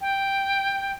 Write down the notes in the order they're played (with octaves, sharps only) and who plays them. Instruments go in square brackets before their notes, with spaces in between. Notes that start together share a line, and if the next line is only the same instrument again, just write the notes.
[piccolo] G5